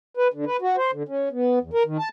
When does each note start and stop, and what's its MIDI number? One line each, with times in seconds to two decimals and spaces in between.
0.17 0.28 71
0.33 0.45 50
0.46 0.57 71
0.61 0.76 66
0.77 0.91 72
0.93 1.03 50
1.09 1.29 61
1.32 1.59 59
1.61 1.70 40
1.73 1.83 70
1.86 1.97 51
1.99 2.09 81